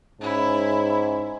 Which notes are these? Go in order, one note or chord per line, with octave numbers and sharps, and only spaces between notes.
G#2 C#4 E4